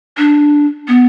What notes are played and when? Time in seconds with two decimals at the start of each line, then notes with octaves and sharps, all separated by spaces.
0.18 D4
0.88 B3